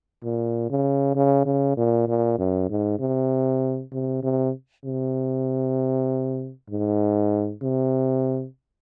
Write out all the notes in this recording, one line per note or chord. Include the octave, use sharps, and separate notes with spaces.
A#2
C#3
C#3
C#3
A#2
A#2
F#2
G#2
C3
C3
C3
C3
G#2
C3